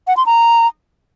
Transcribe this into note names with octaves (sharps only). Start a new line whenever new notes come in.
F#5
C6
A#5